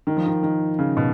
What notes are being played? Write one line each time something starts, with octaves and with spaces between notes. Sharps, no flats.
D#3
F3
D#3
D#3
C#3
B2